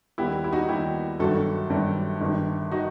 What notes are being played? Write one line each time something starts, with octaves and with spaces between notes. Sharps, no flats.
D#2 D#3 G3 B3 E4 G4
E4
D#4 F#4
D#2 D#3 G3 B3 E4 G4
G1 G2 D#3 F#3 F#4 A4
G1 G2 D#3 F#3
G1 G2 D#3
D#3 D#4 F#4